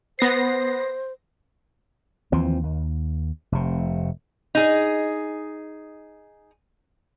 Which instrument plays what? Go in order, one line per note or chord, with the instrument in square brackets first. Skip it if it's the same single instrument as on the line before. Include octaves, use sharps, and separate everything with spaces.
[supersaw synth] B3 A#6 C7 [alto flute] C5
[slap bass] D#2 E3 F3 C4
D#2
F1 C3
[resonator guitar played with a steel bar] D#4 G#4